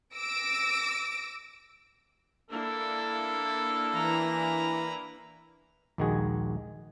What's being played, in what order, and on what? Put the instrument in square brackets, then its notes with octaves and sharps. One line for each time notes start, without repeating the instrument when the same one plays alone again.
[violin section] D6 E6 A#6 D7
[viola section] A#3 D4 E4 [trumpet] A4
[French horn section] E3 [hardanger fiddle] B4 A#5
[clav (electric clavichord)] A#1 D#2 D#3 G#3 F#4 G#4